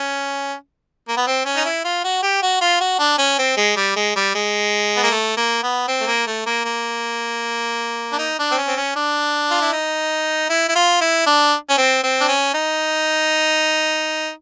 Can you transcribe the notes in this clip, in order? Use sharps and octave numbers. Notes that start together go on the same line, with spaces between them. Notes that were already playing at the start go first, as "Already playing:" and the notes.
Already playing: C#4
A#3
B3
C4
C#4
D#4
E4
F4
F#4
G4
F#4
F4
F#4
D4
C#4
C4
G#3
G3
G#3
G3
G#3
B3
A#3
A3
A#3
B3
C4
A3
A#3
A3
A#3
A#3
D4
D#4
D4
C4
C#4
C4
C#4
D4
F4
E4
D#4
E4
E4
F4
E4
D4
C#4
C4
C4
D4
C#4
D#4